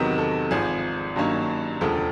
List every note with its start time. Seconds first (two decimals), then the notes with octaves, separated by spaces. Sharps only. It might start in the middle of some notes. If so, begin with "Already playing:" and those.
Already playing: E2 C3 D#3 F#3 B3 A#4
0.18 A4
0.51 G#1 G#2 F3 G#4
1.16 G2 D#3 F#3 A#3 C#4
1.81 E1 D2 C#3 F3 A4